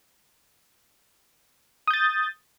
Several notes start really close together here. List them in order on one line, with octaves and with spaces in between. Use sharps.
D#6 G6 A6